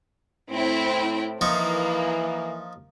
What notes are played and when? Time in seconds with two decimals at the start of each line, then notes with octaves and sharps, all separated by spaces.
0.50 A2 C4 E4 G5
1.41 E3 F3 A#3 D#4 C#6